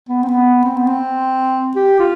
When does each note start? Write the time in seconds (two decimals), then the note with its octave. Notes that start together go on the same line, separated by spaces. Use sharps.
0.09 B3
0.23 C4
0.28 B3
0.65 C4
0.76 B3
0.87 C4
1.76 G4
1.99 F4